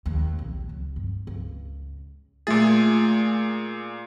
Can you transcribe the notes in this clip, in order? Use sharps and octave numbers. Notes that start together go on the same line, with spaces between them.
D#2
B1
C#2
G2
C#2
A#2 A3 F4 G#4 A6